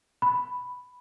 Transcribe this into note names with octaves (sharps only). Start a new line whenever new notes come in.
B5